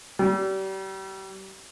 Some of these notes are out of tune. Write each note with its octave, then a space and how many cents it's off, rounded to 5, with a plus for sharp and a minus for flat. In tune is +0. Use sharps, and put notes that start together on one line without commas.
G3 -35